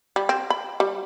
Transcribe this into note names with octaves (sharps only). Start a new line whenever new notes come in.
G3
C4
B5
G3